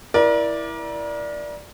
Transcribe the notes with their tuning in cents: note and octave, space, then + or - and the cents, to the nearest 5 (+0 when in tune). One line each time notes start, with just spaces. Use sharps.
E4 +0 A#4 +35 D5 +0